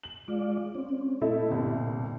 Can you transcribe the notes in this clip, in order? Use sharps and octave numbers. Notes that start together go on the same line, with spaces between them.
F#7
G#3 F4 D5
C4 C#4
A#2 A3 D#4 E4
G1 C2